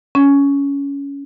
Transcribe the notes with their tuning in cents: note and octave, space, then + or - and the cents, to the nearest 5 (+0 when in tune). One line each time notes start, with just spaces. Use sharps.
C#4 +15